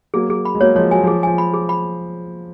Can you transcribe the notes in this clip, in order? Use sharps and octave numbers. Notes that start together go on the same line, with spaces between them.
F#3 A#3 G#4
F#3 G#4
B5
G#3
F#3 A#3 C#5
F3 G#3 C#5
F#3 G#5
F3 G#4
F3 G#5
B5
G#4
B5